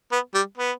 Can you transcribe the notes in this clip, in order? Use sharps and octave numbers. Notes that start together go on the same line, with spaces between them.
B3
G3
B3